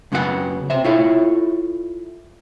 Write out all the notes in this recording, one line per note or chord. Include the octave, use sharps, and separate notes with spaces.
F#2 C#3 F#3 B3 G4 F#5
C3 C5 E5
E4 F4 A4 C#5 E5 F5